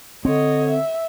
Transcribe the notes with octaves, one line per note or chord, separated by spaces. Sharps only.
D3 C4 C#5 D#5
E5